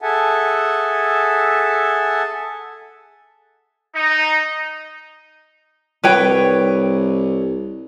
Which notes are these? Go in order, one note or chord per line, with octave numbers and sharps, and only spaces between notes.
G#4 A4 E5 F#5 G#5 A5
D#4
C2 B4 C#5 G5